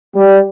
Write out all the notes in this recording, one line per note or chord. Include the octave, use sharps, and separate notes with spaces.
G3